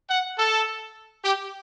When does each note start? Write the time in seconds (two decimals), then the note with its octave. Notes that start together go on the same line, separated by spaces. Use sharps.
0.10 F#5
0.38 A4
1.24 G4